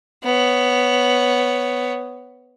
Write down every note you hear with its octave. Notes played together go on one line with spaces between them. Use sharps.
B3 C#5